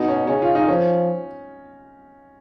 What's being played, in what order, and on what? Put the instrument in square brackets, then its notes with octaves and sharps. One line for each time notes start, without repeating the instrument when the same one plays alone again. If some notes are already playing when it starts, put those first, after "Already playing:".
Already playing: [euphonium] B2 [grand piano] D#4
[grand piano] C#4
[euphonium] C#3 [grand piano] C#4
[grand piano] F4
D#4
[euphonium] F3 [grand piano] C#4